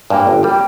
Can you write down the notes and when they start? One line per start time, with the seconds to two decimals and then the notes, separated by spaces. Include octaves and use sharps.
0.10 G2 G3 A#3 G5 G#5
0.27 G1
0.43 G3 A#3
0.50 G5